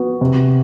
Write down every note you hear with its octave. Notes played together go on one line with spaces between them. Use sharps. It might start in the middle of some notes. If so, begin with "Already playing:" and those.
Already playing: B3 F#4
C3